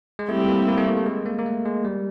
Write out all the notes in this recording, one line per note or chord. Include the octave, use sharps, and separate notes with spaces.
G#3
G3 A3 C4 E4 G4
A#3
A#3
A3
A#3
A3
G#3
A#3
A#3
A3
G#3
G3